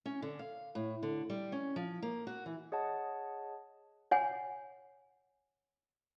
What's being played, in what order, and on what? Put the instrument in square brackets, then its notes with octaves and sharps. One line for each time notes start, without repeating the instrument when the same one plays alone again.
[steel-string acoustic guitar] C#4
D3
F5
A2
D3
G3
C#4
F3
A#3
F#4
E3
[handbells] G#4 C#5 D#5 F#5 A5
[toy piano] C#5 F#5 G#5